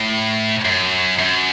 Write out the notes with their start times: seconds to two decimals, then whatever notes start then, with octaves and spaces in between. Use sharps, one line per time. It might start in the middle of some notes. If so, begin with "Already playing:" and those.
Already playing: A2
0.65 F#2
1.19 F#2